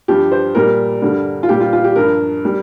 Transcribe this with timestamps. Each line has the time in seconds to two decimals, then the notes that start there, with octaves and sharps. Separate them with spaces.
0.08 G2 F3 G4
0.32 C5
0.55 A#2 G3 A#4
1.02 G2 D3 G3
1.43 F4
1.49 A#2 G3 G4
1.60 F4
1.73 F4
1.84 G4
1.96 G2 F3 A#4
2.45 G3